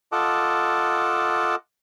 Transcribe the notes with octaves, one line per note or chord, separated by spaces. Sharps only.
F4 A4 D#5 F#5 A5 D6